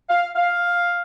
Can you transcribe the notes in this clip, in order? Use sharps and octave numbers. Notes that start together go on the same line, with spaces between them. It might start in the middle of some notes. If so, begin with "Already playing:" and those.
F5
F5